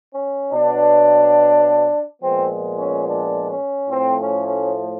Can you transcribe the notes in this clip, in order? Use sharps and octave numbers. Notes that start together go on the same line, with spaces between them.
C#4
B2 F#3 B3 D4
A#2 F3 G#3 B3 C4
C#4
D4
C#4
A2 F3 A3 C4
C#4
C#4